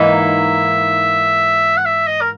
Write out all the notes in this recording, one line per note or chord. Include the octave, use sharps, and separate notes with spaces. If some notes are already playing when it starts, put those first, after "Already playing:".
Already playing: G#2 E3 A#3 D#4 E5
F#5
E5
D#5
A#4